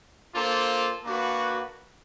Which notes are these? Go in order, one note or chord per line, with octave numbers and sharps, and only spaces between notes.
A#3 D4 F4 A4 C5
A#3 D4 F#4 B4